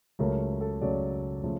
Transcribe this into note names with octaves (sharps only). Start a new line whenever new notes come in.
C#2 C#3 F#3 A3 C#4 A#4
A4
C#2 C#3 F#3 A3 C#4 D5
C#3 F3 A3